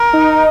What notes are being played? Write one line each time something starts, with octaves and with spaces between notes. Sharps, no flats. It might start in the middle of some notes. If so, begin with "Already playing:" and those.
Already playing: A#4
D#4